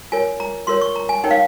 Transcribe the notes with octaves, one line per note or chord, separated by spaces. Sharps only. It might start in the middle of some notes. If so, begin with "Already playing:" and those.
F4 A#4 C#5 G#5
A#5
F4 A#4 C#5 C6
C#6
A#5
G#5
D#4 A#4 C#5 G5
F5